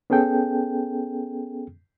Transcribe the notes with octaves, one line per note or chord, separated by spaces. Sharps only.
B3 C#4 G#4 A4 G5